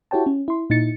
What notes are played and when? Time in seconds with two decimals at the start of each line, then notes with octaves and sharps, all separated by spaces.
0.11 E4 F#4 G4 C#5 G5 A5
0.26 C#4
0.48 E4 C6
0.70 A#2 D#4 E4 A6 C#7